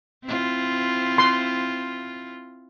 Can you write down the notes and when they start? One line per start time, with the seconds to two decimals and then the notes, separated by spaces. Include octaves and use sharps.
0.24 C4 E4 F4
1.18 C6